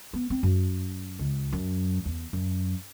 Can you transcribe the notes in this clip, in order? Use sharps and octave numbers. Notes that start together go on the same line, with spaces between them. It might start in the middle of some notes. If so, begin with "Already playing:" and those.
B3
C4
F#2
C#2
F#2
E2
F#2